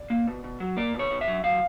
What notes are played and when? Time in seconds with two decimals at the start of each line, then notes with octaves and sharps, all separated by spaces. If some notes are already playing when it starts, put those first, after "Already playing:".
Already playing: D5
0.10 A#3
0.27 B2
0.44 B2
0.60 F#3
0.77 A#3 D5
0.94 B2
0.99 C#5
1.11 B2
1.21 E5
1.28 F#3
1.43 F#3 F5